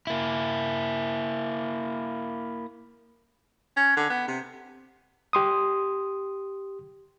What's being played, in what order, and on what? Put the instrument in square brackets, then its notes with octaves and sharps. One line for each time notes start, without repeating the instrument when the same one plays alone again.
[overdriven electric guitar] A#3 E4
[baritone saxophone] C#4
D3
B3
C3
[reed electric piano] G4 C6 D#6